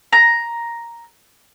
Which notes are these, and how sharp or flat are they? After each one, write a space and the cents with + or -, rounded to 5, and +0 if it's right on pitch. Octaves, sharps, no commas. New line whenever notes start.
A#5 +5